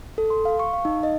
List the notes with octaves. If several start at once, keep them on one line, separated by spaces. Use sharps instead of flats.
A4
C6
F5
C#6
F5
D#4
D#5